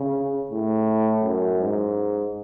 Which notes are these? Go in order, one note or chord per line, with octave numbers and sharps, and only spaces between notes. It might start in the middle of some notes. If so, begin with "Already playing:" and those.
Already playing: C#3
A2
F#2
G#2